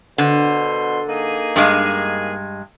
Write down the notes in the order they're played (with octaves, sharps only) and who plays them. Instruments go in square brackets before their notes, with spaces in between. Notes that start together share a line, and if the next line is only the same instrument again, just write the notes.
[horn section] B2 C5 C6 [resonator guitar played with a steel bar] D3
[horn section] A#3 D#4 G#4
[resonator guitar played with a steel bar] G2 G#3